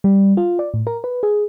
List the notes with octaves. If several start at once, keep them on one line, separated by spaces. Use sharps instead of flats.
G3
F4
D5
A2
A#4
B4
G#4